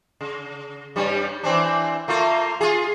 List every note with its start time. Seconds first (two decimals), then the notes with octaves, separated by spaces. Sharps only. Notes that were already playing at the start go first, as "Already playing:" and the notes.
0.21 C#3
0.96 G2 G3 C#4
1.43 E3 C4 D4
2.08 A3 A#3 F4
2.61 F4 G#4